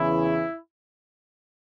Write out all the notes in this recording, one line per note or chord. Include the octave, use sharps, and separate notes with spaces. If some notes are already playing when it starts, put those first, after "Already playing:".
Already playing: E2 C#3 E3 E4